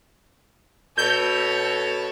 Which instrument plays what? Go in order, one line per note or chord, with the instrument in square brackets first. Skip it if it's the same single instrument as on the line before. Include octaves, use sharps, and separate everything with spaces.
[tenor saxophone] B2 [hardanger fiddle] A4 C#5 [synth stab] G6